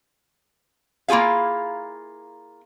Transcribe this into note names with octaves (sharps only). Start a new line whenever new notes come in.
A#3 E4 F4 G#4 F5